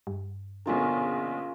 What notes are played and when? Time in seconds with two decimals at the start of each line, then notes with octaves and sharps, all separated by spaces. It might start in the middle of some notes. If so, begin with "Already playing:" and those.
0.07 G2
0.66 A#1 B2 D3 C#4 F4 A#4